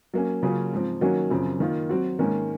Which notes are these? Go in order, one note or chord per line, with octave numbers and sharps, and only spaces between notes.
F#3 A#3 C#4
C#3 F#3 A#3 C#4 F4
G#2 F3 C4
D#3 F#3 A#3 C#4 F#4
F#2 C#3 F3 C4
D#3 A#3 F4
F#3 C4 F#4
G#2 D#3 A#3 C#4